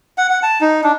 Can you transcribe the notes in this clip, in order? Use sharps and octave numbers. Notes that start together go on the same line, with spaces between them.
F#5
F#5
A5
D#4
D4